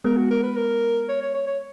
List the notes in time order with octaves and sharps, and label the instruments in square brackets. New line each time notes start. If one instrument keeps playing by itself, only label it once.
[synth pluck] G#3 B3 [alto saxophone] A#4
[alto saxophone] F#4
A#4
B4
A#4
C#5
C#5
C#5
C#5